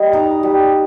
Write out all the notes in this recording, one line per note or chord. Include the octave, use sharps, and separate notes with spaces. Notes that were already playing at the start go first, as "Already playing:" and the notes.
Already playing: G3 D#5
D#4
G3